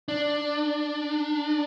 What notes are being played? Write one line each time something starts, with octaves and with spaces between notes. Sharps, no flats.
D4